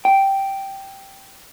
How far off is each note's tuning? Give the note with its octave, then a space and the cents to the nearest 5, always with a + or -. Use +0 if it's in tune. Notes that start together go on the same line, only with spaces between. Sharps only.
G5 -5